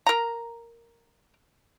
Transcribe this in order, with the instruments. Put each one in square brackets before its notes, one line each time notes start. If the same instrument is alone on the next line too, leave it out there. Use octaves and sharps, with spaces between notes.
[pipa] A#4 A#5